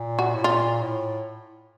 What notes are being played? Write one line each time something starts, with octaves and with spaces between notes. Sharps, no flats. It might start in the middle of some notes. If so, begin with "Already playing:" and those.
Already playing: A#2
F#4
A2
A#2 F4
A2